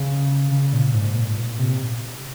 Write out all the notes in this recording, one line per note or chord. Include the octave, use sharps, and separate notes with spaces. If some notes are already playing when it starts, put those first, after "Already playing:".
Already playing: C#3
C#3
A#2
G#2
A#2
A#2
C3